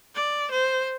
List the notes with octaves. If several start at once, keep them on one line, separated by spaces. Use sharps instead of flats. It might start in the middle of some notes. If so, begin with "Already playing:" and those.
D5
C5